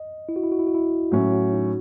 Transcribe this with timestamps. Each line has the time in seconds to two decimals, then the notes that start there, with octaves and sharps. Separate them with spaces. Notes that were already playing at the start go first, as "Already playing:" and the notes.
Already playing: D#5
0.29 E4
0.36 F#4
0.44 E4
0.52 F#4
0.59 E4
0.67 F#4
0.75 E4
1.12 A2 F#3 C#4 F#4
1.32 F#4
1.53 D#4